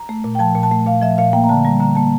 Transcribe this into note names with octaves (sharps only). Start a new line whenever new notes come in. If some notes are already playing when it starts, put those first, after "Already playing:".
Already playing: A#5
A3
A#2
G5
F3 A5
A#2
A5
A3
A#2 F5
F3 E5
A#2 F5
A#3 G5
A#5
D3 A5
G3 A#5
D3 A#5
A#3 A5